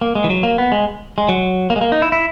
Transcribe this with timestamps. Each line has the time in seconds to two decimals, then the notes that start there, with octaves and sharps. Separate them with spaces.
0.01 A#3
0.15 G#3
0.24 E3
0.30 F#3
0.43 A#3
0.58 B3
0.72 G#3
1.18 G#3
1.29 F#3
1.70 A#3
1.76 G#3
1.81 A#3
1.92 D#4
2.02 E4
2.12 E4